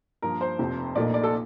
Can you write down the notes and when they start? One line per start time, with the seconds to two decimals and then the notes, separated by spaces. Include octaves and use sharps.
0.22 G2 F3 A#3 A#4
0.41 C5
0.59 F1 F2 C3
0.95 A#1 A#2 A3 D#4 D5
1.14 D5
1.24 A4